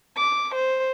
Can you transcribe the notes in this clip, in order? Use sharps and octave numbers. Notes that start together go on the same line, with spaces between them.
D6
C5